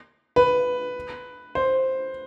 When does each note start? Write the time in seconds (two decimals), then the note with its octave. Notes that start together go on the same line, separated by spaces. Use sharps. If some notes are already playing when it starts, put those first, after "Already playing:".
0.36 B4
1.55 C5